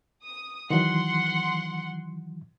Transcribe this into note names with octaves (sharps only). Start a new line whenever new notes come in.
D#6
D#3 E3 F#3 F#5 C6